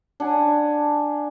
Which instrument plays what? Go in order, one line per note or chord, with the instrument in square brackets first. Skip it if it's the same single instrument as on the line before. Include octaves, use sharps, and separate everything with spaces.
[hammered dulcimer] D4 F#5 G#5